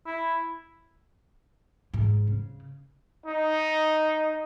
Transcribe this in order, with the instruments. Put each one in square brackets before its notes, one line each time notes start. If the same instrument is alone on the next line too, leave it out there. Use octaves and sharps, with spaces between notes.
[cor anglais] E4
[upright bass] G#2
C#3
[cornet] D#4